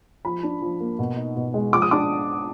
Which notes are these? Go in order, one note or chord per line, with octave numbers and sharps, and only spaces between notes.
F3 B5
D4
F3
A#3
B2
D#4
B2
G#3
F3 D6
D#6
D4 D6